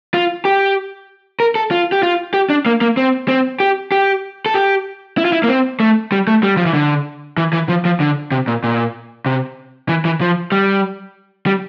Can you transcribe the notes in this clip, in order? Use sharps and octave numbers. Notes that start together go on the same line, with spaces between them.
F4
G4
A#4
A4
F4
G4
F4
G4
D4
A#3
A#3
C4
C4
G4
G4
A4
G4
E4
F4
E4
A#3
C4
A3
G3
A3
G3
F3
E3
D3
E3
E3
F3
F3
D3
C3
A#2
A#2
C3
E3
E3
F3
G3
G3